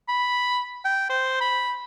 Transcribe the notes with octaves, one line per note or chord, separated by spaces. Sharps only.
B5
G5
C5
B5